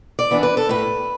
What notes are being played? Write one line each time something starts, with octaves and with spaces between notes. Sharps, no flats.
D5
E3 B3 D4
B4
A4
A2 B4